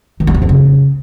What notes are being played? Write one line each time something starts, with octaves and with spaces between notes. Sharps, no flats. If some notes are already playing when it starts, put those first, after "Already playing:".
D#3
G3
E3
F2
C#3